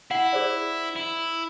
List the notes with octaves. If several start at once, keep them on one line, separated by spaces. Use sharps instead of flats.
E4 F#5
G#4 C5 D5
E4